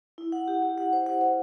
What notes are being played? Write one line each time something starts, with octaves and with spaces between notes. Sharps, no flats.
E4
F#5
G4
G4
F#5
C5
F#5
C5